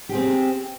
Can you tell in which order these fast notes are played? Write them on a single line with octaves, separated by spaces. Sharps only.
G4 G#4 C4